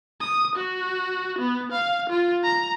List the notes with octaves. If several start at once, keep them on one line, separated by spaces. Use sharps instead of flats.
D#6
F#4
B3
F5
F4
A#5